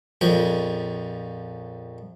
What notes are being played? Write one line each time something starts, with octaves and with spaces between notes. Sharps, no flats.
A#1 F2 F3 C#4 B5